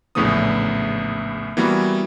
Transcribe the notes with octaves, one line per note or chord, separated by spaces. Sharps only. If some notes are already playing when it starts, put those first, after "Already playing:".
A#1 E2 A2 C#3 B3 D#6
E3 G3 A#3 B3 F#4